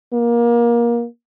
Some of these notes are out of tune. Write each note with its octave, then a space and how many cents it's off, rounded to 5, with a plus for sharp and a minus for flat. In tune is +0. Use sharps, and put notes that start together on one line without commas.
A#3 +25